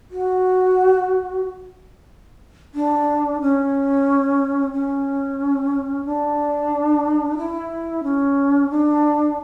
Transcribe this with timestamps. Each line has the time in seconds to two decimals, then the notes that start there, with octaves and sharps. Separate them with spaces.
0.11 F#4
2.74 D4
3.41 C#4
4.73 C#4
6.05 D4
7.37 E4
8.03 C#4
8.70 D4